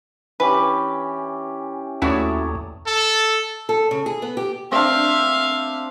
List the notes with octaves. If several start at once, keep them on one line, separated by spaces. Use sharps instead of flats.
E3 C#4 G4 B4
D#2 A3 C#4 E4 F#4 C#5 D5
A4
A4
C#3
G#4
B3
G4
C4 D4 E5 F5